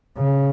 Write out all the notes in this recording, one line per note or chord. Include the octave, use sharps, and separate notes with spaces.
C#3